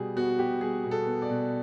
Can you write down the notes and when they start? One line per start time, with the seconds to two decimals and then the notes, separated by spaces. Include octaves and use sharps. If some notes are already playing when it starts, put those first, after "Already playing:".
Already playing: B2 G3 G#4
0.16 B3 F#4
0.39 B2 G4
0.61 G3 G#4
0.84 B2
0.91 A4
1.06 B3
1.22 D5
1.30 B2